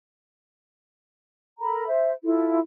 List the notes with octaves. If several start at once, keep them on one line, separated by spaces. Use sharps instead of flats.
A4 A#4 A#5 B5
C5 E5
E4 F4 A4